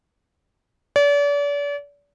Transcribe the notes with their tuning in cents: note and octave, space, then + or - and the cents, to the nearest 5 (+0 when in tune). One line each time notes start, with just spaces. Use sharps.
D5 -40